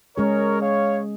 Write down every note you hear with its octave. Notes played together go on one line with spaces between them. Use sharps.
G#3 C#4 G#4 A#4 C#5
C#5 F5